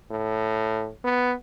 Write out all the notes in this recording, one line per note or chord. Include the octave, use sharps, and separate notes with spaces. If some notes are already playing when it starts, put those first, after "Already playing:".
A2
B3